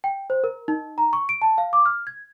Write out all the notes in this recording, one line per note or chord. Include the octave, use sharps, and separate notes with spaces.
G5
C5
A#4
D#4
A#5
C#6
D7
A5
F5
D6
F6
G#6